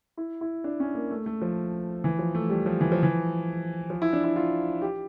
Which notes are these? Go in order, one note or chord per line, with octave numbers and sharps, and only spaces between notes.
E4
E4
D4
C#4
A#3
A3
A3
F3
E3
F3
A3
G3
F3
E3
F3
E3
F3
E4
D4
E4
F4
G4